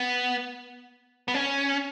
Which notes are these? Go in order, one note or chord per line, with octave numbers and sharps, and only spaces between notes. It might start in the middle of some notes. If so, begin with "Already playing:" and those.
Already playing: B3
B3
C#4